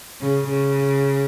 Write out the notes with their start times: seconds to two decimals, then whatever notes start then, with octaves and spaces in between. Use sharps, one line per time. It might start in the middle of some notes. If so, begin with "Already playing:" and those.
0.20 C#3
0.49 C#3